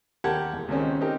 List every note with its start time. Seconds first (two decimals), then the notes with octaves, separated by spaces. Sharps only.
0.24 D#2 G4 A#4 F#5 A5 G#6
0.54 E1
0.68 C#2 D#3 C4 C#4
1.01 C4 D#4 G4 A#4